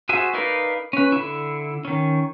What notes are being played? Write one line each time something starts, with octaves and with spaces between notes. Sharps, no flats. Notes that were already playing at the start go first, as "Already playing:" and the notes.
F#4 G#4 C5 E5 G#5
D#4 A#4 B4 D5 F5
C#4 B4
D3 E4
D#3 C#4